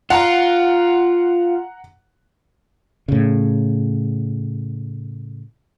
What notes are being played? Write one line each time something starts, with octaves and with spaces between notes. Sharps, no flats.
F4 F#5 A#5
A2 C#3